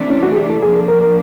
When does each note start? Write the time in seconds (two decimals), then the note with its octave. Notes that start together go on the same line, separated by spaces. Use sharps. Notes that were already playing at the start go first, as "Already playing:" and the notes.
Already playing: C3 E3 A3 D4
0.10 C#4
0.23 F#4
0.32 G#4
0.36 G4
0.50 A4
0.62 F3 A#3 D4 G#4
0.76 A4
0.88 A#4
1.01 A#4